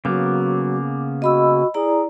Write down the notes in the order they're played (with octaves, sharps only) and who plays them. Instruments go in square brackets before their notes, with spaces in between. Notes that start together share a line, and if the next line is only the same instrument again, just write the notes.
[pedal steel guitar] C#3 A#3 B3 [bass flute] F#3 [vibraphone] D6
[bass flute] F#4 [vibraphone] D#5 B5 E6
[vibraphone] E4 D5 A#5 [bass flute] G#4